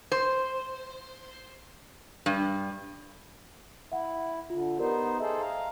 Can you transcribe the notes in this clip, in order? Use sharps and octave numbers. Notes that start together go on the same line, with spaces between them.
C5
G2
E4 E5 F#5
D3 F4
B3 D#4 G4 A#4 C5 D5
G#4 A4 C5 D#5 E5
F5 A#5